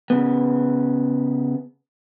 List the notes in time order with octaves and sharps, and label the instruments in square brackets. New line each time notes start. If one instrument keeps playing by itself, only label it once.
[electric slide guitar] C#3 B3